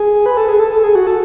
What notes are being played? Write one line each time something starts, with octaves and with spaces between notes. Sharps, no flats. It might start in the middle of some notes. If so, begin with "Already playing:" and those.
Already playing: G#4
B4
A4
G#4
A4
A4
G#4
F#4
A4